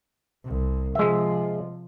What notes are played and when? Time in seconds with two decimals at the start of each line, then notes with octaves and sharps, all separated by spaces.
0.44 C2
0.95 C3 F3 G#3 E5